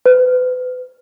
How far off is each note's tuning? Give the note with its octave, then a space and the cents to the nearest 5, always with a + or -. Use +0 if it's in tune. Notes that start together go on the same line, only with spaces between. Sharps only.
B4 +35